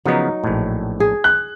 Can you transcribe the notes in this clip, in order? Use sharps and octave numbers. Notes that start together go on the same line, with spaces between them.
C#3 F3 F#3 B3 D#4
A#1 A2
G#4
F#6